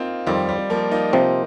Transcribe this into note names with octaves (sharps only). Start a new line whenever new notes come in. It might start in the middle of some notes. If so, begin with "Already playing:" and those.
Already playing: A#3 C4 D#4 F4
F2 D#3 G3 C4
G3
F3 A#3
A#3 D#4
C3 F3 A#3 C4 D#4